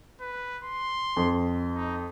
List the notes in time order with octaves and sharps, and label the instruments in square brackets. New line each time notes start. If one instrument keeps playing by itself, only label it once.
[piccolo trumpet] B4
C6
[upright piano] F2
[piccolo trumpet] D#4